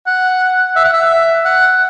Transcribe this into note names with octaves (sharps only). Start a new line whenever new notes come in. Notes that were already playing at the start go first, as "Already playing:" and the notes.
F#5
E5
F#5
E5
F#5